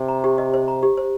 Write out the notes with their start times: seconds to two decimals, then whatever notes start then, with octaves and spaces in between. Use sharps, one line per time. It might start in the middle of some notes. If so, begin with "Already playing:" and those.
Already playing: C3
0.08 A#5
0.24 G4
0.38 D#5
0.54 C5
0.68 A#5
0.83 G4
0.97 C5